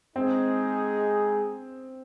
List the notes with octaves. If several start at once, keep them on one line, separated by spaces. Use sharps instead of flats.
G#3 C4 D#4 G#4